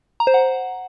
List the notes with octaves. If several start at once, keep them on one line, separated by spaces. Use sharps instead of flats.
A#5
C5
F#5